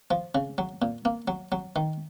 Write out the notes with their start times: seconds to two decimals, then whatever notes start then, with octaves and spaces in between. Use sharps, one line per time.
0.11 F3
0.35 C#3
0.58 F#3
0.82 A#2
1.05 A#3
1.28 F#3
1.52 F#3
1.76 D#3